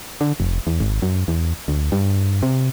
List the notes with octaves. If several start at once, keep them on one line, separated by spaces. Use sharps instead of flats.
D3
F1
E2
G#1
F#2
E2
D2
G2
C3